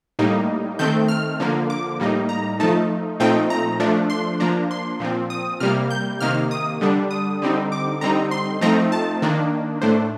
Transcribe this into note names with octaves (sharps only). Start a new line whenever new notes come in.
A2 G3 A#3 D#4
D#3 A3 C4 G6
F6
D3 F3 A#3
D6
A2 G3 A#3 D#4
A#5
F3 A3 D#4 A5
A#2 F3 A3 C4 D#4 G5
A#5
F3 A3 D4
C6
F3 A#3 D4 A#5
C6
A#2 F3 C4
D#6
C3 G3 A#3 F6
G6
C3 D#3 A#3 F6
D#6
D3 G3 D4
D#6
D3 G3 C4 D#4
D6
D3 G3 C4 D#4 A#5
C6
F3 A3 C4 D#4 A#5
A5
D#3 A#3 D4
A2 A3 D4 C5